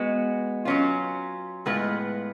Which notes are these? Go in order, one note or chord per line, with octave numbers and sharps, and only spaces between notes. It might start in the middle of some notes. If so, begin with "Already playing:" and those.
Already playing: G#3 B3 F#4
F#3 C#4 F4
A2 G#3 B3 F4 B4